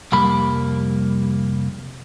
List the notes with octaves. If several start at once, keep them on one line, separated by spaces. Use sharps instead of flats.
C2 F2 G3 A#3 B5